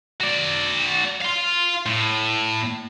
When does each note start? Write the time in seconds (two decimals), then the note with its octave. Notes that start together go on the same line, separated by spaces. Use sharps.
0.21 F#4 D5
1.21 F5 C6
1.86 A2